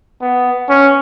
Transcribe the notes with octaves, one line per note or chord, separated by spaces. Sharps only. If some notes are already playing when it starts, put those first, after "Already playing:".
B3
C#4